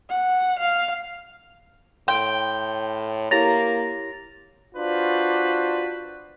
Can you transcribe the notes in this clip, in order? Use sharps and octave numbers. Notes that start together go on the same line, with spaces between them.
F#5
F5
A2 G5 C6 G7
A#3 E4 G4 C#5 A#5 A6 A#6 F7
D4 F4 F#4 B4 C5 D5